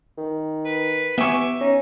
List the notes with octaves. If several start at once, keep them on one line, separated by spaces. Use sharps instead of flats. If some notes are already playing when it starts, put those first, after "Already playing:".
D#3
B4
B3 G4 E5 G#5 C#6
C#4 D#4